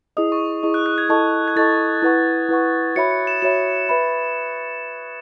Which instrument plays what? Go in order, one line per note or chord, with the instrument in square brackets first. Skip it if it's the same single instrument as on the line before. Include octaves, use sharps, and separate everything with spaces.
[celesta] E4 G#4 D#5 [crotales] D#6
[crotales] C#6
[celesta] E4 G#4 D#5
[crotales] F#6
F#6
G#6
[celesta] E4 A4 D#5 A5 C#6
[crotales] G#6
[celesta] E4 A4 D#5 A5 C#6 [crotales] A6
[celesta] E4 B4 F#5 C#6
E4 B4 F#5 C#6
[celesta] F#4 C#5 E5 B5 [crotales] C#7
[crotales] C#7
E7
[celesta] F#4 C#5 E5 B5 [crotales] E7
[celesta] B4 E5 B5